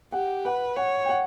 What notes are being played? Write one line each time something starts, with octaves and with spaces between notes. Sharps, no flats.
G4 F#5
B4 F#5
C#5 F#5
G5
F#5